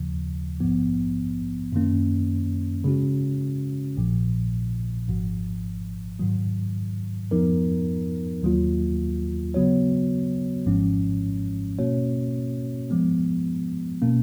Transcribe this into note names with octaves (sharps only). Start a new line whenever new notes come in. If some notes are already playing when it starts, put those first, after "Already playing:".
Already playing: D#2 C#3 F3
A#1 G#2 F3 B3
F#2 D#3 A#3 C#4
C#3 G#3 C#4 F#4
A#1 A#2 F3
G#1 G#2 F3
G#2 D#3 F#3
F2 F3 B3 D#4 A#4
D#2 D#3 F#3 A#3 F4
C#3 F#3 B3 F#4 C#5
G#1 G#2 F3 G#3 C#4
B2 A#3 C#4 F#4 C#5
F3 G#3 B3
B2 A#3 C#4